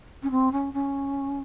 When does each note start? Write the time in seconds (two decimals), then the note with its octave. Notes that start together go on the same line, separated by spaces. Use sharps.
0.22 C#4
0.30 C4
0.51 C#4
0.73 C#4